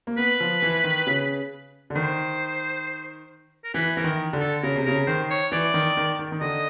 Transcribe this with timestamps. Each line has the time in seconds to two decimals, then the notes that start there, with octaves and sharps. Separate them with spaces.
0.07 A#3
0.18 B3 B4
0.40 F3
0.62 E3
0.84 D#3
1.07 C#3
1.90 D3
1.95 D#3 C5
3.64 A#4
3.74 E3 B4
3.96 E3 A#4
4.04 D#3
4.33 D3
4.40 A4
4.62 C#3 A#4
4.76 C3
4.85 C#3 A#4
5.07 D#3 C5
5.30 C#5
5.52 E3 D5
5.74 D#3
5.97 D#3
6.19 D#3
6.32 D#3
6.41 D3 D#5